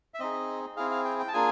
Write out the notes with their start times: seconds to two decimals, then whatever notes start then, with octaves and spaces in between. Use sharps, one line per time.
0.14 E5
0.20 C4 D#4 G#4 D#5
0.77 C4 E4 G#4 F5
0.91 F5
1.05 G5
1.19 G5
1.28 A5
1.33 A#3 D4 F4 G#4 G#5